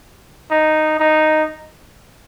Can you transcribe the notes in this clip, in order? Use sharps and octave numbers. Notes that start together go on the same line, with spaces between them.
D#4
D#4